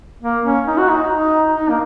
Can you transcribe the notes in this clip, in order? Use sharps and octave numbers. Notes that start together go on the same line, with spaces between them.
A#3
C#4
D#4
F#4
D#4
D#4
D#4
A#3